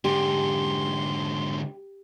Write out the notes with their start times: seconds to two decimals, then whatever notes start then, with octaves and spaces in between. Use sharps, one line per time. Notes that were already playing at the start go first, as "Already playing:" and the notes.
0.04 G#2 D3 G4 C6